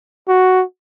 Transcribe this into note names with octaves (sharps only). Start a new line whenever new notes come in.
F#4